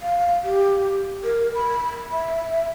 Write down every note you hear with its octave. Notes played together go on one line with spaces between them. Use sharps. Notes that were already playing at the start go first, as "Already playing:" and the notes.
F5
G4
A#4
B5
E5